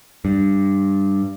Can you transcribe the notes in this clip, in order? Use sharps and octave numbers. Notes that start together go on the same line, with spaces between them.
G2